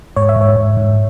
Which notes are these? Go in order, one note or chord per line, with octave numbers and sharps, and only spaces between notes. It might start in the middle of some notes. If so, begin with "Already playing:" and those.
G#2 C#5
E5
G#2 C#5
G#2
G#2